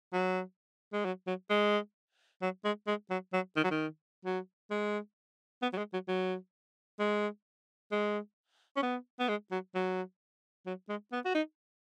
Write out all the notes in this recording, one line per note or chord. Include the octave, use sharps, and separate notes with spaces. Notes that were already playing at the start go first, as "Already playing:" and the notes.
F#3
G#3
F#3
F#3
G#3
F#3
G#3
G#3
F#3
F#3
D#3
F#3
D#3
F#3
G#3
B3
F#3
G#3
F#3
F#3
G#3
G#3
C#4
B3
B3
G#3
F#3
F#3
F#3
G#3
B3
F#4
D#4